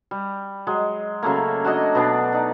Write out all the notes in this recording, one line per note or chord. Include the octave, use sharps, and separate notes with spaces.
G3
F#3 G#3
C#3 F#3 A3 A#3
D4 F#4 C#5 D#5
B2 B3 D4
D#4 D5